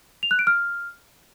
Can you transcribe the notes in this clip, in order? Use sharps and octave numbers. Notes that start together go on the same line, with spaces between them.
F7
F#6
D7
F6